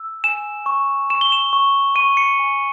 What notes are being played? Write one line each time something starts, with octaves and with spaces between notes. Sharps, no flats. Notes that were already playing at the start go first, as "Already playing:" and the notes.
Already playing: E6
G#5 E7
C#6
C#6 E7
G7
E7
C#6
C#6 D#7
C#7
G#5